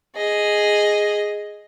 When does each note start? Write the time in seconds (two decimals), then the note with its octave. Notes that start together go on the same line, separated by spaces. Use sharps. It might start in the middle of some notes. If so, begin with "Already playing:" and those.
0.16 G#4 D#5